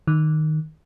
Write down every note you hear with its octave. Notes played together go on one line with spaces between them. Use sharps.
D#3